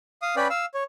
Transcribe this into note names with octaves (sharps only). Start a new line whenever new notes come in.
F5 D#6
C#4 B4 D5 G5 B5
F5 E6
C#5